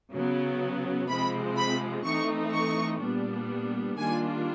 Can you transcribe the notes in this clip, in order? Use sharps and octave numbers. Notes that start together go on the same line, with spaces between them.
C#3 F#3 B3
C3 F3 G#3 C4 B5
B5
E3 A3 C4 D#4 C#6
C#6
A#2 G3 B3 D4
D#3 G3 A#3 D4 F4 G#5